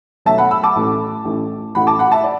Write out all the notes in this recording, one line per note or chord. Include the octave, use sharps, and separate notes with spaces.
B1 B2 F#3 A3 E5 A5
F#5 B5
B5 E6
A5 D6
A1 A2 A3
A1 A2 A3
A1 A2 A3 F#5 B5
A5 D6
F#5 B5
E5 A5
D5